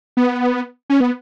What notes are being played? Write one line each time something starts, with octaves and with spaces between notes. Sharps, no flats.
B3
C#4
B3